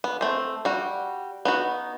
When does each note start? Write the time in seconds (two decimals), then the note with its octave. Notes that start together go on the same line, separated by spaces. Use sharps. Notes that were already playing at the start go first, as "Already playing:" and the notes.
0.04 B3
0.21 A3 C4
0.65 G3 F#4
1.45 B3 D#4 F#4